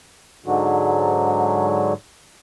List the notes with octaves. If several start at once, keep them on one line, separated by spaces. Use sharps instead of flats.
G#2 D3 F#3